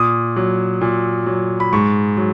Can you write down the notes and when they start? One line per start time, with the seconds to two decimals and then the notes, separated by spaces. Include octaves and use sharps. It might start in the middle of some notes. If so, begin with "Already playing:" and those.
Already playing: A#2 D#6
0.36 F#3
0.81 A#2
1.26 F#3
1.60 B5
1.73 G#2 C#6
2.17 F#3